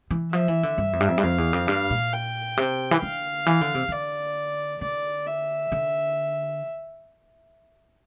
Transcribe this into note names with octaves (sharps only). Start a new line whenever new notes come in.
E3
F3 E5
E3
D3
G2
F2
G2
F2
G2
F2 F5
E2
F2
G2 F5
A#2
G5
C3
E3
D3 F5
E3
D3
C3
D3 D5
D3 D5
E5
D3